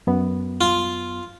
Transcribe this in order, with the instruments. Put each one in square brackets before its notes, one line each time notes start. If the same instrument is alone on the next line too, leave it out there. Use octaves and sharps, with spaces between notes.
[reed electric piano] F#2 B3
[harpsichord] F4